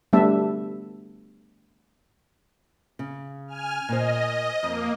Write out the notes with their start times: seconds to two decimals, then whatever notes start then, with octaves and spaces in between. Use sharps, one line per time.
0.13 G3 A3 B3 D4 E5 A5
2.99 C#3
3.48 G#5 F6
3.89 A#2 C5 D#5
4.63 F2 A#3